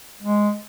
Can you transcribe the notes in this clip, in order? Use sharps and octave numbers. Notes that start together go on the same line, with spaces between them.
G#3